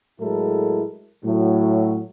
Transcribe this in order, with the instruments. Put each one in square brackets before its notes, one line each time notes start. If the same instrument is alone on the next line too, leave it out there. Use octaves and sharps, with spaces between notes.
[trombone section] A2 F#3 G#3 E4 A4 A#4
A2 F#3